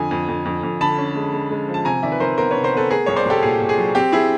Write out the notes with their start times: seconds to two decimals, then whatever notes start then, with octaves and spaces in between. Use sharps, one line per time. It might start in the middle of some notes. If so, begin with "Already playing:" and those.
Already playing: F2 D3 G#5
0.11 F2
0.28 F2
0.45 F2
0.63 F2
0.81 D3 A5 B5
0.98 C#4
1.16 G#3
1.33 G#3
1.51 G#3
1.68 F3
1.74 A5
1.85 C3 G#5 A#5
2.03 D#3 D5 E5
2.12 B4
2.20 D#3 A#4 C5
2.37 B3 A#4 C5
2.51 B4 C#5
2.56 C3
2.64 A#4 C5
2.73 B3 A4 B4
2.90 A3 G#4 A#4
3.06 C2 C#5
3.16 C5 D5
3.26 C2 G4 A4
3.43 A#2 G#4
3.60 A#2
3.69 G#4
3.78 F#3
3.95 C4 G4
4.12 E4 G#4